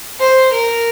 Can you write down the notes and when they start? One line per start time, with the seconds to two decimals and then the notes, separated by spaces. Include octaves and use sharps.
0.20 C5
0.52 A#4